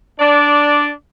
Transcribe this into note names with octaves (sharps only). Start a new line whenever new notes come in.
D4 D5